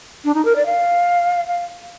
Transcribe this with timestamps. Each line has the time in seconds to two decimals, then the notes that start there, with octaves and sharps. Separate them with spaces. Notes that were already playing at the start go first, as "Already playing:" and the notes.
0.25 D4
0.35 D#4
0.45 A#4
0.56 D5
0.66 F5
1.47 F5